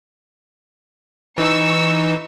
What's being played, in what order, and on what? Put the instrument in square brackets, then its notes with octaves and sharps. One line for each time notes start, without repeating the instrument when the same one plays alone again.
[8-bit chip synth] E3 D#4 [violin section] C#6 E6